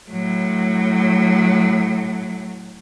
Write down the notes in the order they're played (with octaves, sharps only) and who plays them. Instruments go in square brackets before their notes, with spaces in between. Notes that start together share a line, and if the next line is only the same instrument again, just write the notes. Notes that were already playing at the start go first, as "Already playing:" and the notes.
[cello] A2 F#3